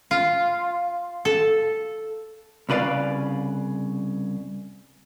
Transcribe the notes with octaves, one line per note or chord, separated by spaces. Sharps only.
F4
A4
C2 C#3 B4 D5 F5